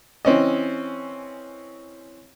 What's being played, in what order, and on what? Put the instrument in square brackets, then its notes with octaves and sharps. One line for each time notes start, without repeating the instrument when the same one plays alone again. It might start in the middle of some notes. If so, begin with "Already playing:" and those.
[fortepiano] E3 C4 C#4 D#5